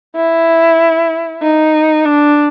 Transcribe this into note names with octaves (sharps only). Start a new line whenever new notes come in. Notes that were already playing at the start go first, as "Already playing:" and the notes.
E4
D#4
D4